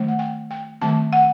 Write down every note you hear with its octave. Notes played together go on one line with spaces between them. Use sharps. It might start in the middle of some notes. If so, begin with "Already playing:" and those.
Already playing: D#3 F#3 A3 C4
F#5
G5
G5
D#3 F#3 A3 C4 A5
F#5